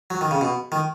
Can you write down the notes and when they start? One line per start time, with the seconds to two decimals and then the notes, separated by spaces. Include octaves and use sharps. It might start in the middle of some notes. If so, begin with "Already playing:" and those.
0.10 F#3
0.21 D#3
0.31 C#3
0.41 B2
0.72 D#3